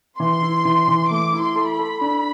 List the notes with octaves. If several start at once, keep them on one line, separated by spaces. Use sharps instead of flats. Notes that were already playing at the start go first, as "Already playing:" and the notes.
E3 C6
E4
E3
E3
A3 D6
E4
C6
A4
B5
A4
D4